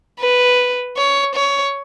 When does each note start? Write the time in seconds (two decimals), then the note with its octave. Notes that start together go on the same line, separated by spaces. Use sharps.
0.19 B4
0.97 C#5
1.35 C#5